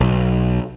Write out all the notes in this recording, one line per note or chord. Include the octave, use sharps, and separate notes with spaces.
B1